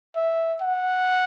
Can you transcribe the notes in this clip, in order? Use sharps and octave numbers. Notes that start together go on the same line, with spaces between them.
E5
F#5